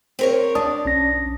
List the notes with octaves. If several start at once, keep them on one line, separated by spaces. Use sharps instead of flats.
C4 A#4 C#5
D4 D5 A5 D#6
B1 C#4 A#6